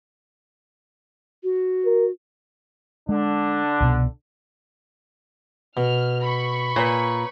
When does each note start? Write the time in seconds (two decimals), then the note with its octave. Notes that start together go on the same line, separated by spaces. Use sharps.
1.44 F#4
1.85 A#4
3.09 D3 G#3 D4
3.80 C2 B2 B3
5.77 B2 F6
6.25 B5 C#6
6.76 A#2 B4 C#5